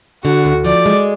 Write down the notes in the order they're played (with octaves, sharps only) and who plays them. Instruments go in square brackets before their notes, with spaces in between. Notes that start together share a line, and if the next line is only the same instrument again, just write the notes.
[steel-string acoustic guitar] D3 [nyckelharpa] F#4
[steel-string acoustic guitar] D2
[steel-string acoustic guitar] F3 [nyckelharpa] D5
[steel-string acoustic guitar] G#3